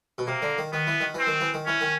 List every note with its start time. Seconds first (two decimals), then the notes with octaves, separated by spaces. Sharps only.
0.18 B2
0.27 C3 A#3
0.42 D3
0.58 D#3
0.73 D#3 B3
0.87 E3
1.01 D#3
1.14 E3 C4
1.27 D#3
1.41 E3
1.54 D#3
1.66 E3 C#4
1.81 D#3